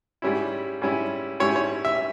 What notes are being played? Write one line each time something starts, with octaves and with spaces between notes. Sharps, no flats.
G#2 G3 C#4 E4
G#2 G3 C#4 E4
G#2 G3 C#4 E4 C#5
C#5
E5